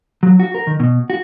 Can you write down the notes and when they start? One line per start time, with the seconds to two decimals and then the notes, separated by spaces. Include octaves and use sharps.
0.23 F#3
0.40 F#4
0.55 A#4
0.67 D#3
0.80 B2
1.10 F#4